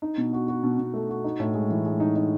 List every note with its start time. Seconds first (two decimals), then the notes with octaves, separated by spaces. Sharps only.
0.02 D#4
0.18 B2
0.33 F#4
0.48 F#4
0.63 B2
0.79 B2
0.94 A3
1.09 F#4
1.24 D#4
1.40 A2
1.55 G#3
1.70 E3
1.85 G#3
2.00 D#4
2.16 D#4